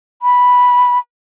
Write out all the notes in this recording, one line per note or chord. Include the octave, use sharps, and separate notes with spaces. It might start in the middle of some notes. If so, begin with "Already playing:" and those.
B5